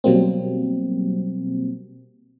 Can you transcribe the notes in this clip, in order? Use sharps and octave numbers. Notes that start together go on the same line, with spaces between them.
B2 F#3 G3 A#3 C4